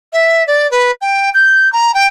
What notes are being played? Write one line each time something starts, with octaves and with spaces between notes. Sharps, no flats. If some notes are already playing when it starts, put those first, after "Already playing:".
E5
D5
B4
G5
G6
A#5
G5